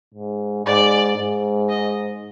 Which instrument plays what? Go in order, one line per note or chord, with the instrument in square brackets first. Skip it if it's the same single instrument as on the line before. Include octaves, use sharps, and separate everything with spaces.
[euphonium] G#2
[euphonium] G#2 [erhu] D5
[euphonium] G#2
[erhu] D#5